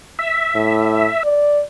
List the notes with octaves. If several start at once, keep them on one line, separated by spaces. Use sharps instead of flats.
E5
A2
D5